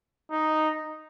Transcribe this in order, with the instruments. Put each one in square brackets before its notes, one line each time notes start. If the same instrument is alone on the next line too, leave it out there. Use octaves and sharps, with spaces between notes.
[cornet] D#4